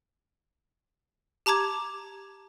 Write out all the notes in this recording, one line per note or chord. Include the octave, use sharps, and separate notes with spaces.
G4 A5 A#5 D6 G#6